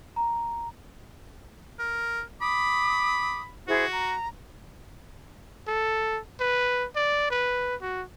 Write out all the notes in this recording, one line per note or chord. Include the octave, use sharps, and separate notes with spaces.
A#5
A#4
B5 D6 D#6
E4 F#4 G#4 C5
A#5
A4
B4
D5
B4
F#4